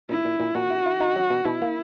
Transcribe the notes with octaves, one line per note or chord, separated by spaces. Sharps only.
A#2 E4
A#2
A#2
A#2 F#4
E4
E4
D#4
F#3
B2
B2 E4
A#3